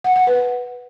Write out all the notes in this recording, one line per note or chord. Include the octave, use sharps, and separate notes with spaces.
F#5
F#5
B4